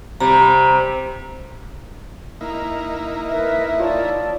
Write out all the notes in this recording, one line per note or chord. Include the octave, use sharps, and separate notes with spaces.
C3 G3 A#5
A#3 D#4 E4 A#5
A#4 B4 E5
F4 C#5 D5 A5